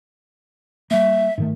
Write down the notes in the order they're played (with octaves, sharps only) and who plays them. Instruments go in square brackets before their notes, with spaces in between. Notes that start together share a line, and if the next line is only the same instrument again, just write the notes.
[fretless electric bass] G3 A#3 [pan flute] E5
[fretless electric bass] G#2 D#3 A3